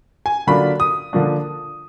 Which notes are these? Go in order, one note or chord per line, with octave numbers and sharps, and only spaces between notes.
G#5
D3 F#3 A#3 D4 F4 B5
D#6
D3 F3 A#3 D4